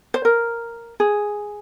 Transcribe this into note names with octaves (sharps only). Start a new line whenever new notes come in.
C5
A#4
G#4